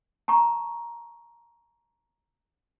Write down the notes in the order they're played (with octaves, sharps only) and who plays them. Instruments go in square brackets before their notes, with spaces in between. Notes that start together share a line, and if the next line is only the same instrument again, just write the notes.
[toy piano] A5 A#5 C#6